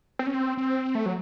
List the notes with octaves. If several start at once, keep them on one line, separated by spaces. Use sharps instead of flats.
C4
C#4
C4
C4
A3
F#3